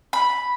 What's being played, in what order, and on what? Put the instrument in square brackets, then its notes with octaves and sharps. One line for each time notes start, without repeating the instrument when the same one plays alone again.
[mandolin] B5